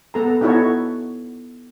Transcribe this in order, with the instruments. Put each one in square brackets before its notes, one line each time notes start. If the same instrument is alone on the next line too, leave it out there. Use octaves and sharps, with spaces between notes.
[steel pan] B3 A4 A#5
B3 D#4 E4 F#4 A4 C#5